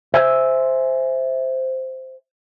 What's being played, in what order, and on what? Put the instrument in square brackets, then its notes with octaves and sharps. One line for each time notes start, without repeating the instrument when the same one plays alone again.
[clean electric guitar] C5 E5 G#5